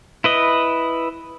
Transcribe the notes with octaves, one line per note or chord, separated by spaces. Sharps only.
E4 B4 D#5